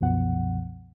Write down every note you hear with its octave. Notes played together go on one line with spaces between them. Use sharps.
C2 F#2 B2 F3 B3 F#5